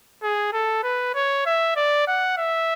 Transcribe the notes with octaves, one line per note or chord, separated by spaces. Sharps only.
G#4
A4
B4
C#5
E5
D5
F#5
E5